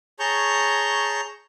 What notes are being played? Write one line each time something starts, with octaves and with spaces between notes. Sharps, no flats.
G#4 C#5 A5 A#5 C#6 G6